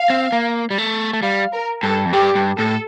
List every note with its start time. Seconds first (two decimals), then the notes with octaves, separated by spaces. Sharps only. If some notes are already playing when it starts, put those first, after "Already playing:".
Already playing: F5
0.10 C4
0.32 A#3
0.70 G3
0.78 A3
1.13 A3
1.23 G3 F5
1.52 A#4
1.83 G2 A4
2.06 F2
2.13 G2 G4
2.35 G2
2.57 A2 A4